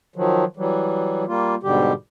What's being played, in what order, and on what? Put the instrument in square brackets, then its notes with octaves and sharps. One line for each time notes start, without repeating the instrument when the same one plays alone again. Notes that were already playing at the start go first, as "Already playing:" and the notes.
[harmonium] D#3 F3 F#3
E3 F#3 G3
G3 A#3 F4
G#2 B2 D3 G3 G4